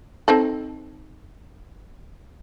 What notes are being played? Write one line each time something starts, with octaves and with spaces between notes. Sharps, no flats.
C4 D#4 A4